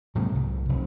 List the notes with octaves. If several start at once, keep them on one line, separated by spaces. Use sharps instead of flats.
G#2 C3 F#3 A#3
C2
F1